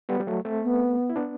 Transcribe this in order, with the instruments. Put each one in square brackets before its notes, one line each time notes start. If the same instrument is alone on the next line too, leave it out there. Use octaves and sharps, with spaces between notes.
[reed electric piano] G3 B3
G3
F#3 A3
A3 C4
[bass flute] B3
[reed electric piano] E4
B3 D4